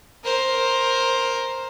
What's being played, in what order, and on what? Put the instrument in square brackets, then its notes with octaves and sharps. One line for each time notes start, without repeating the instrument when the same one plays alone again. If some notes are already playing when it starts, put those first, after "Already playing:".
[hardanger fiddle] A#4 C5